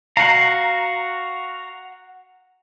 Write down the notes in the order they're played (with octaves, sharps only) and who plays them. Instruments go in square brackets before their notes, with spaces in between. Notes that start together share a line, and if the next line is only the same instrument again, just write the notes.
[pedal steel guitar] F#4 A#5 [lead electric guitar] F5 F#5